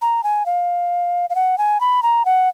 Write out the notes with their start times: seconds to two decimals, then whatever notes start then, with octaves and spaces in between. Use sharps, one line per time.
0.02 A#5
0.24 G#5
0.46 F5
1.30 F5
1.35 F#5
1.58 G#5
1.81 B5
2.03 A#5
2.25 F#5